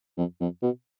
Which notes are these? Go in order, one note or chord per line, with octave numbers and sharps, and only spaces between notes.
F2
F2
B2